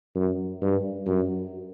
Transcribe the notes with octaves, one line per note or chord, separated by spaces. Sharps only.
F#2
G2
F#2